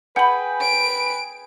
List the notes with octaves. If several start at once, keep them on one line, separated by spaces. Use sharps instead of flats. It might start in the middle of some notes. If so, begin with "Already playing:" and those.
G#4 B4 F#5 G5 B5
D7